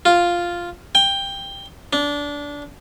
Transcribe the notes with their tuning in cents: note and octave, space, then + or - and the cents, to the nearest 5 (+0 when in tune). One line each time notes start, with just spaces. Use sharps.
F4 +0
G5 +15
D4 -20